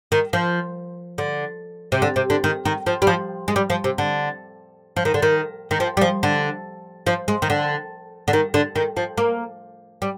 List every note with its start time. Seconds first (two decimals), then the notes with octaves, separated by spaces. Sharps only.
0.12 D#3
0.33 F3
1.18 D3
1.92 C3
2.02 D3
2.16 C3
2.30 D3
2.44 D#3
2.65 D#3
2.86 F3
3.02 G3
3.07 F3
3.48 G#3
3.56 G3
3.70 F3
3.84 C3
3.98 D3
4.97 F3
5.05 D#3
5.14 D3
5.22 D#3
5.71 D#3
5.80 F3
5.97 G3
6.01 F3
6.23 D3
7.06 F3
7.28 G#3
7.42 D#3
7.50 D3
8.28 D3
8.33 D#3
8.54 D3
8.76 D#3
8.97 F3
9.17 A#3
10.02 G3